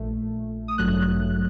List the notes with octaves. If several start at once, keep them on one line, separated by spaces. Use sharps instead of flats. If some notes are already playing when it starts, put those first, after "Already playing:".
Already playing: A#1 A#2 A3
D#6
A1 G2 F#3 A3 F#6